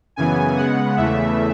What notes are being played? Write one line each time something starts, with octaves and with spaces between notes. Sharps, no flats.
F#2 C#3 E3 B3 G#5
C#3 G#3 B3 F#5
E2 C#3 E3 A3 E5